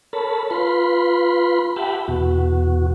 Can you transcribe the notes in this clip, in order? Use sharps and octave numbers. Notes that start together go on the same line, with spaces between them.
A4 A#4 C#5 A5 B5
F4 B4 B5 C6
G4 E5 F#5 G5 A5 B5
E2 B2 F#4